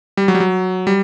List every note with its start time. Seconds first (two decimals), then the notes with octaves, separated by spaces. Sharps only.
0.17 G3
0.28 F#3
0.35 G3
0.40 F#3
0.87 G3